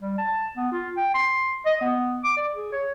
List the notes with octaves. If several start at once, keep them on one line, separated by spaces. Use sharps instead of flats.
G3
A5
B3
F4
G5
C6
D#5
B3
D6
D5
G#4
C#5